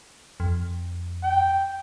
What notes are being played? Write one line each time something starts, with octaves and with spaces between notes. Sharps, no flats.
F2
G5